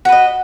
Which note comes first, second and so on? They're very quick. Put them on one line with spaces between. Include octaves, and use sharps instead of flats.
F#4 B4 D#5